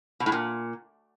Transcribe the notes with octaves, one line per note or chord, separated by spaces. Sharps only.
B2
A2
A#2